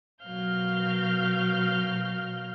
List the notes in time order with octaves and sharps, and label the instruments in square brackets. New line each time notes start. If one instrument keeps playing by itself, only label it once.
[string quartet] B2 F#3 A#4 F5 F6 G6